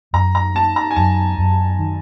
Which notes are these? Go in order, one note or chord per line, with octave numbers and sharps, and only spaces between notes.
F#2 A#5
A#5
A#3 A5
A#5
G#5
F#2 A5
F#2
D#3